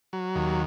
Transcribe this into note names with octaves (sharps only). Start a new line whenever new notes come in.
F#3
D#2